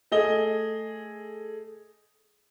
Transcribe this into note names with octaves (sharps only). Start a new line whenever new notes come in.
A3 G#4 D#5 G7